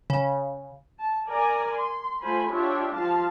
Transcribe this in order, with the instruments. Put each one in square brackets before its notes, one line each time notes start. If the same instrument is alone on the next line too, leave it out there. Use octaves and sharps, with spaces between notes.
[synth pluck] C#3
[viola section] A5
A#4 D5 G#5 A#5
C6
A3 F4 C5 G#5 B5
D4 F4 G4 C#5 E5
F3 F4 F5 A5